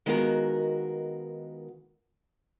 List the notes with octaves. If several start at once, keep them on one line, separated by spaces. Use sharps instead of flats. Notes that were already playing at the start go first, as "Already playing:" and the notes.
D#3 G#3 B3 F4 F#4 A#4